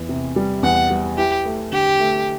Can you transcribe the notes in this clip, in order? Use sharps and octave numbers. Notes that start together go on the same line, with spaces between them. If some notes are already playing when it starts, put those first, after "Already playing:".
Already playing: E2 E3
C3
G3
E2 F#5
G3
E4 G4
A3
D3 G4
A3